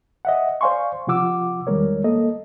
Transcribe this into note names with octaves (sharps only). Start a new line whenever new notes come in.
D#5 E5 F#5
C5 D5 F5 G#5 C6 C#6
C3 F3 F4 F#5 D6 E6
E2 D#3 G3 G#3 A#4 C#5
A#3 A4 D#5